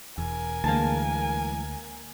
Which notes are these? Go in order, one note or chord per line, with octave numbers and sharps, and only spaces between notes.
E1 E2 A#4 G#5
D2 E3 G#3 A#3 A5